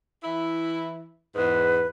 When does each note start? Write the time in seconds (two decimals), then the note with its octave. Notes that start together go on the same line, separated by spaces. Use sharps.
0.24 E3 E4
1.35 E2 G#2 B4